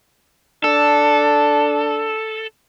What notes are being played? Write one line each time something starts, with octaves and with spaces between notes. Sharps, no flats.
D4 A4